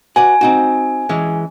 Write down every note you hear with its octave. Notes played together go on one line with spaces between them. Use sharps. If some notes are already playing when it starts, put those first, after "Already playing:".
F#4 B4 D5 G#5
C4 D#4 F#4
E3 G#3 C#4